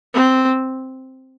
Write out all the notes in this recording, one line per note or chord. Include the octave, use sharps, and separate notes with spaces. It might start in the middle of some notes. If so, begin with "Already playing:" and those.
C4